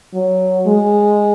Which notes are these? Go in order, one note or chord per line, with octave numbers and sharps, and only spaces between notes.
F#3
G#3